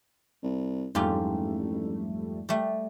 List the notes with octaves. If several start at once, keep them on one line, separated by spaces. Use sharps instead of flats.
C2
A1 F2 G#2 G3 A3 F4 G4
G3 A3